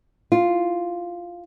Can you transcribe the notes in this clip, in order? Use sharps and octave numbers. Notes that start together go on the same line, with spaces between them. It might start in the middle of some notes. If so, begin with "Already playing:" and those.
F4